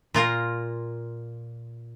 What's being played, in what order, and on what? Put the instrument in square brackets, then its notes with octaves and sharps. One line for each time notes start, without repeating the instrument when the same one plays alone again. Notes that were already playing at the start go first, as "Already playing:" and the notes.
[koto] A#2 F4 A#4